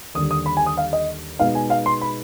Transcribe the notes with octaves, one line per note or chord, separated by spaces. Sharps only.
D#2 D3 G3 D#6
D#6
B5
G#5
D#6
F5
D#5
B2 G#3 B3 D#4 F5
G#5
F5
C6
B5